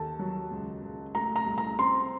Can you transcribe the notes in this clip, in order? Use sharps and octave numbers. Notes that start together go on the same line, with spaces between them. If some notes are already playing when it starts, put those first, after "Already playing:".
Already playing: D#2 A4 A5
F#3
C#2
C#2
A3 A#5
A#5
C2
A#5
C4 C6